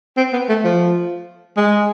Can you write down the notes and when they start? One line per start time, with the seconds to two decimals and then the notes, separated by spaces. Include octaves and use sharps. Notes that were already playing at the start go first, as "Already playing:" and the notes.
0.17 C4
0.33 B3
0.49 A3
0.64 F3
1.57 G#3